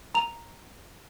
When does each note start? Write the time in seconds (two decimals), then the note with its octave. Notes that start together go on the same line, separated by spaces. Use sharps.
0.14 A#5 F7